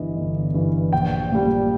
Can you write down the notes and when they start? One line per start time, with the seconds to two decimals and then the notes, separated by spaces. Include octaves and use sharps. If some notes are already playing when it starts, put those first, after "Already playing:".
Already playing: G1 G2 E3 D#5
0.15 G1
0.54 G2 E3
0.93 A#1 G5
1.32 A#2 G3